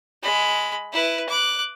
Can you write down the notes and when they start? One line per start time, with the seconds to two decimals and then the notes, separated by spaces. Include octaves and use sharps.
0.23 G#3 B5
0.93 E4 B4
1.29 D6 F#6